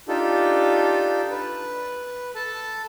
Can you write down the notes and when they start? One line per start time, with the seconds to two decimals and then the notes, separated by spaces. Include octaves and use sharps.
0.08 D4 D#4 F4 G4 A4
1.31 B4
2.35 A4 A5